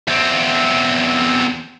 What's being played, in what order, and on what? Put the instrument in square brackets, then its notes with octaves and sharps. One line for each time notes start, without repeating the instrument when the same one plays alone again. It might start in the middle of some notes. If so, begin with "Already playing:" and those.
[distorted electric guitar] E2 C4